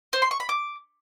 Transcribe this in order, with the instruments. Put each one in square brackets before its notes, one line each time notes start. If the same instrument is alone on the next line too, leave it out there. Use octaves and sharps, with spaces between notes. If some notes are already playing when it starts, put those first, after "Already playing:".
[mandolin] C5
C6
C#6
B5
D6